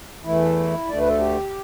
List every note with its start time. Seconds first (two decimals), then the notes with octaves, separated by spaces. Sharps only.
0.24 E2 E3 A3 E4
0.86 D2 D3 A3 D5
0.99 B4
1.08 A4
1.19 G4